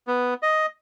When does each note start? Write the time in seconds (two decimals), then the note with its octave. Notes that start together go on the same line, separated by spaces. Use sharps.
0.07 B3
0.43 D#5